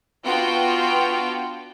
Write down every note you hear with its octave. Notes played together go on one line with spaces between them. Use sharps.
B3 D4 F4 F#4 G5